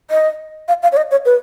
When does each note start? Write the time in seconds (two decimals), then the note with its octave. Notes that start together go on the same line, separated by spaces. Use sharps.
0.11 D#5
0.68 F5
0.83 F5
0.92 C#5
0.97 D#5
1.11 C#5
1.25 B4